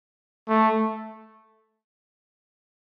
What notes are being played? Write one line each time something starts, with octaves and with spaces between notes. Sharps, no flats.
A3